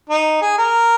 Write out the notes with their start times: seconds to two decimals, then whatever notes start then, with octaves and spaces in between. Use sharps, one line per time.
0.10 D#4
0.41 G#4
0.58 A#4